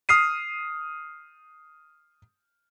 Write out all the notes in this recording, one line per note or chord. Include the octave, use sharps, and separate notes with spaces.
D#6 F6 C7 D#7